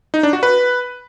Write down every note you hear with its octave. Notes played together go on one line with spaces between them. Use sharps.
D#4
D4
F#4
B4